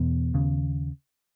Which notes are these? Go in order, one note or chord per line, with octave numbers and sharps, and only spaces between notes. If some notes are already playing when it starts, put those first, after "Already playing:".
Already playing: E2 B2 B3
D#2 C#3